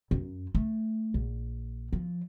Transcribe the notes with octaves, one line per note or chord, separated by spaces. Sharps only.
F#2
A3
A#1
F3